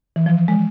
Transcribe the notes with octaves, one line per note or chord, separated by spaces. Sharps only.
E3
F3
G#3